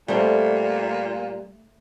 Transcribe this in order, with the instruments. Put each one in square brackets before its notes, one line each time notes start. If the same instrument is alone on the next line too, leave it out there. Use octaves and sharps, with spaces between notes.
[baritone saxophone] A#2 [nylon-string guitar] G3 C4 [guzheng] A3